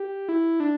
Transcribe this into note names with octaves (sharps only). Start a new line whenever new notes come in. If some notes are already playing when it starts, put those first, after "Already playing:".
Already playing: G4
E4
D4